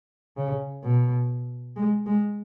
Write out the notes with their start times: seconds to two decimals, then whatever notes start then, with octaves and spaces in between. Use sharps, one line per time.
0.37 C#3
0.83 B2
1.76 G#3
2.06 G#3